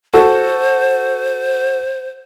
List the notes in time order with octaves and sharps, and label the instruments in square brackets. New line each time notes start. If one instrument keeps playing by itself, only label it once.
[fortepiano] F#4 A4 [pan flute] C5